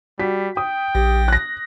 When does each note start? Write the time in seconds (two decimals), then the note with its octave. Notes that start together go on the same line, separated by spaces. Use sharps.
0.19 G3 F#4 B6
0.57 G5 D#6
0.95 A#1 G4
1.28 F#6 A#6